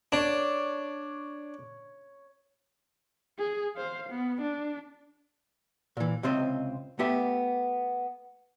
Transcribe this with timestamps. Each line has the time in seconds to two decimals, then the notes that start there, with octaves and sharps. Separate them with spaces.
0.12 D4 C#5
3.38 G#4
3.76 C5 F5
4.10 B3
4.42 D4
5.97 A#2 E3
6.23 C#2 C3 C4 C5 D#5
6.99 A3 B3 G4 E5